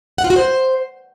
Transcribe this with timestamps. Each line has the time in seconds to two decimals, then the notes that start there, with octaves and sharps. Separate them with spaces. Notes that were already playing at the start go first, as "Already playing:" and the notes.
0.18 F#5
0.24 F4
0.30 F#4
0.36 C5